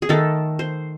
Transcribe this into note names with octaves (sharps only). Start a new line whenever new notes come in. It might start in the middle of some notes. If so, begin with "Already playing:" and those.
G#4
D#3 A3 A4
C5